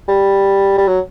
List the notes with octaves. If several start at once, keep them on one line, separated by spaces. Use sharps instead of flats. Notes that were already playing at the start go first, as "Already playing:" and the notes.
G3
G3
F#3